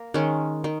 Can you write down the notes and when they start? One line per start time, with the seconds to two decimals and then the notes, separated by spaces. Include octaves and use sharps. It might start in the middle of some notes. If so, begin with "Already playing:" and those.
Already playing: A#3 A#4
0.14 D#3 G#3 C#4
0.64 D#3